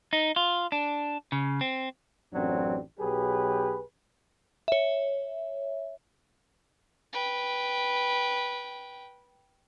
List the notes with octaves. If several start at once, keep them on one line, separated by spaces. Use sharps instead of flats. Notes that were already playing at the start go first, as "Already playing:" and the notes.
D#4
F4
D4
C#3
C4
A1 F#2 F#3 C4 D4
B1 F#3 G4 G#4 B4
C#5 E5
B4 G5